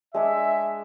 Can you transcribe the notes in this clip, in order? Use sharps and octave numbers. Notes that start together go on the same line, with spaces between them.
G#3 D4 G#4 E5